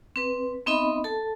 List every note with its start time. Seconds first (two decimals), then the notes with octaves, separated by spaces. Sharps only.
0.16 C4 B4
0.66 B3 C4 D#4 D#5 E5 B5
1.04 A4 A5